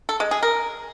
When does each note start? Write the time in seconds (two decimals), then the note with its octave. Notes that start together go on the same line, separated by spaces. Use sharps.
0.09 A4
0.20 G#3
0.31 G#4
0.43 A#4